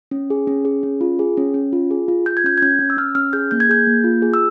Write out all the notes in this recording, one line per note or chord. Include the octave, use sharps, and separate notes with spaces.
C#4
G#4
C#4
G#4
C#4
F4
G#4
C#4
C#4
F4
G#4
F4
F4 G6
G#6
C#4 G6
G#6
C#4 G6
C#4
E6
C#4 F6
C#4 F6
G#4 G6
A#3 G6
G#6
G#4 G6
A#3
F4
G#4
E6